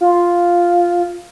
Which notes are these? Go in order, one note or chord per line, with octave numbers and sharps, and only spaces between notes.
F4